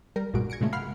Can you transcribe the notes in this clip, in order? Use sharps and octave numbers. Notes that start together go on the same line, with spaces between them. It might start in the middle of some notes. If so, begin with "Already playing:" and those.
G3 A#4
B1 G2 A#2 G#3 F#4 D7
G#6 A#6 C#7 D7
A#2 C#3 G#3 A3
F5 F#5 B5 C6 F6 C7